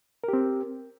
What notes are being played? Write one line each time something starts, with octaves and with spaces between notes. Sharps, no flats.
C4 G4 A#4